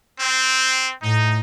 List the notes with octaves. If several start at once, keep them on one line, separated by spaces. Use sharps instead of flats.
C4
A2 D#4